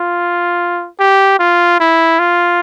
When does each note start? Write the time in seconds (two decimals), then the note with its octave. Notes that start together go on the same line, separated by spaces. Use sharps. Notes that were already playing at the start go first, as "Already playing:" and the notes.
Already playing: F4
0.99 G4
1.39 F4
1.80 E4
2.19 F4